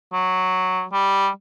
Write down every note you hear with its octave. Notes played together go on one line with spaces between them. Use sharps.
F#3
G3